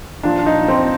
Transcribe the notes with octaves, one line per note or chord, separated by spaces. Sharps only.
A#2 F3 D4
D#4
C4